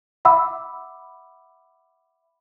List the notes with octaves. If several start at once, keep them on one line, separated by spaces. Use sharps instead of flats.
E5 F#5 B5 D6 E6